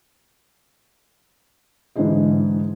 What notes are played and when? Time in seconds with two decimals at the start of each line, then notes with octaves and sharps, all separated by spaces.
1.96 G#2 D3 E3 G#4 D#5